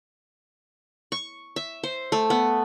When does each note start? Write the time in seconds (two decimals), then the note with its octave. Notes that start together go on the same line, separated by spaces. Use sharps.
1.12 C#6
1.56 E5
1.84 C5
2.12 A3
2.30 B3